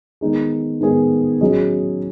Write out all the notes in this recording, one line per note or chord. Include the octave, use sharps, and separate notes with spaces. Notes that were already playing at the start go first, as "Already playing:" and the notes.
D#3 G#3 B3 D#4 G#4
D#3 G#3 B3 D#4 G#4
F#3 C#4 G#4 D#5